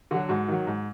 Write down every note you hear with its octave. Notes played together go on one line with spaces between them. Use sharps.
D3 F#3 F#4
G#2 F#4
D#3 F#3
G#2